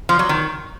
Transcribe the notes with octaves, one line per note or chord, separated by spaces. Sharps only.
F3
F#3
D#3